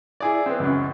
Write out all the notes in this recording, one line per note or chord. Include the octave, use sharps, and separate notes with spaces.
E4 G#4 D5
B3 C4
C#2 F#2